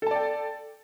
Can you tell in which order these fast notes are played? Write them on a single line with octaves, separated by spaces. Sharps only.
A4 A5 D5 G5